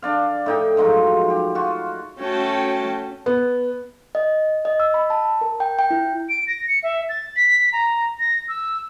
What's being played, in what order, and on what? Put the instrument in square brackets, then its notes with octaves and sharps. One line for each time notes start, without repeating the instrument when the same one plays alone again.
[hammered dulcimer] D4 D5 F5
A2 D#4 G5
G#2 F3 F#3 D#4
G4
F4 F#4
[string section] A3 C#4 F#4 G5 A5
[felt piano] B3
[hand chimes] D#5
D#5
E6
B5
A5
A#4
G5
G5
E4
[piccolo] D7
A#6
C#7
E5
A6
B6
A#5
A#6
E6